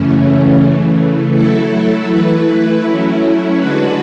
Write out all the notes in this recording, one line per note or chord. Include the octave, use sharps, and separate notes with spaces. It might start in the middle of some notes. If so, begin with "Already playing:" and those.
Already playing: F#2 C#3 E3 A3 C#4
C#3 E3 A3
F#3 A3 E4 A4
E3 A3 E4 B4
F#3 A3 C#4 E4
D3 G#3 D4 F#4 B4